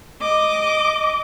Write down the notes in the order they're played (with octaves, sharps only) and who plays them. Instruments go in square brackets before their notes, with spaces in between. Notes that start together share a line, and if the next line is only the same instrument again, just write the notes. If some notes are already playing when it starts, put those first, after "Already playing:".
[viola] D#5 D6